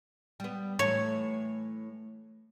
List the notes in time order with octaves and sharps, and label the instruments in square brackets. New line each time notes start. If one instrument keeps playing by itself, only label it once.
[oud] G3 B3
[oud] A2 E3 A3 [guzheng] C#5